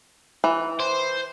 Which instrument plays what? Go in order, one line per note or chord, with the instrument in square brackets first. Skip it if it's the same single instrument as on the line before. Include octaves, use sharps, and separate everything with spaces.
[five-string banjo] E3
[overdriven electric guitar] C5